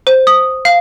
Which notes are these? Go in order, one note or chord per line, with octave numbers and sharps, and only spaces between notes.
C5
D#6
F5